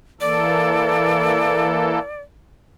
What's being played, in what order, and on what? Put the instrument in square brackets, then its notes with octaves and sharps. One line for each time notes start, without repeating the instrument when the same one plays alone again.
[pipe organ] E3 A#3 A4 [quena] D5